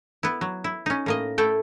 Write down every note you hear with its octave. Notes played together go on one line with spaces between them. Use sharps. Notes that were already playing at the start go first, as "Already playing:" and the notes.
B3 E4
F#3
E4
C#4 D#4
A2 A#3 D#5
A3 E4 A4 G5